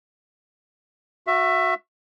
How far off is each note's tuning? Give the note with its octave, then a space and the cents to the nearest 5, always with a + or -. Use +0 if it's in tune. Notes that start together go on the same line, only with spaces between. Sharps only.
F#4 -20 E5 +20